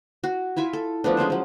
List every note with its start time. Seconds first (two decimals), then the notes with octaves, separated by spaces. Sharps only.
0.24 F#4
0.57 E4 F4 E5 G#5
0.73 A4
1.04 F3 A3 B3 D4
1.17 G#3 C#4 F4 C5
1.30 F3 F#3